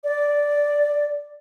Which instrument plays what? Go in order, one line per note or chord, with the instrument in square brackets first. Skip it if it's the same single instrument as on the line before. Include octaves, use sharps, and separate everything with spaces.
[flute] D5